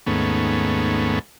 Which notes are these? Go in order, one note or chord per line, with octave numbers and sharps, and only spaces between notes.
D#2 G#2 A3 B3 C#4